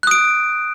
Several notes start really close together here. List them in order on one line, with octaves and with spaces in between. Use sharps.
F#6 D#6 D7